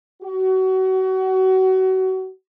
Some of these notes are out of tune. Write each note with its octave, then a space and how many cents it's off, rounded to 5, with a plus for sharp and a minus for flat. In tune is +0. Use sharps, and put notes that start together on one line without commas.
F#4 +30